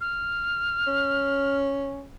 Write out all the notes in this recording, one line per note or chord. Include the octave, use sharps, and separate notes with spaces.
F6
C#4